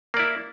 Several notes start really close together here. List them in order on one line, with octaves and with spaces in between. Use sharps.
A#3 D5 E4